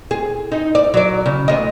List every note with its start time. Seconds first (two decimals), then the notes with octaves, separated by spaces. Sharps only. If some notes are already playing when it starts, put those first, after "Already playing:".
0.11 G#4
0.52 D#4
0.75 D5
0.94 F#3 D5
1.26 C#3
1.48 D2 D#5